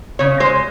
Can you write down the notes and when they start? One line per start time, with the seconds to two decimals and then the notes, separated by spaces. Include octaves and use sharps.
0.19 C#3 C#5
0.40 G#3 C5